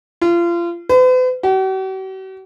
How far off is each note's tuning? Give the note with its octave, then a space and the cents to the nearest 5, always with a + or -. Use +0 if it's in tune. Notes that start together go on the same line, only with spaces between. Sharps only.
F4 -30
B4 +45
F#4 +45